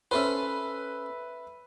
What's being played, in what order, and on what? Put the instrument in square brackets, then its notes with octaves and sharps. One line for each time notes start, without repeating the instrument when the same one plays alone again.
[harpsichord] C#4 A4 C5 [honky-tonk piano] B4 E5